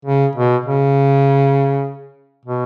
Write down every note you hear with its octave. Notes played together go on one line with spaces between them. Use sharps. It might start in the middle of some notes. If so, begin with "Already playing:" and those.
C#3
B2
C#3
B2